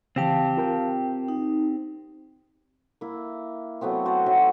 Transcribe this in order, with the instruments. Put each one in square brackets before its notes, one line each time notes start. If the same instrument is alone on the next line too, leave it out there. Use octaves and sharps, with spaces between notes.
[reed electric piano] C#3 E3 [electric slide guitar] C4 G4 [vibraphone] F5 A5
[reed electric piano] F4 A#4 G5
[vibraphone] D#4
[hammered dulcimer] A#3 E4
F#3 A3 B3 C4
F#4 C5 F#5 A5
F#3 D#4 E5